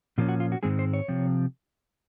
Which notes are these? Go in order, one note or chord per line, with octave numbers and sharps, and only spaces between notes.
A#2 F3 A#3 C#4 F4
F#4
F4
F#4
G#2 D#3 G#3 C4 G#4
C5
C#5
C3 F3 C4